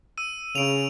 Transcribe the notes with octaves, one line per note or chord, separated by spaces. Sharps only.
E6 D#7
C#3 D7 F7